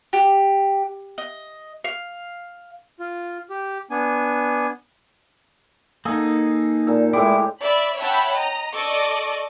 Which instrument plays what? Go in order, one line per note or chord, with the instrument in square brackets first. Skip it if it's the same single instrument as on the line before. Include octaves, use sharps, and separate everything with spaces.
[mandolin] G4
D#5
F5
[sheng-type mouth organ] F4
G4
B3 D4 G#5
[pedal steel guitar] A#3 D#4 [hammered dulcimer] G#4 A4 F#5
[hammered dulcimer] A#2 A4
[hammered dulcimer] A2 G#3 G4 [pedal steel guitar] E4
[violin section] D5 E5 B5
C#5 E5 F#5 G5 A5 B5
D#5 A#5
A4 D5 D#5 C#6 D6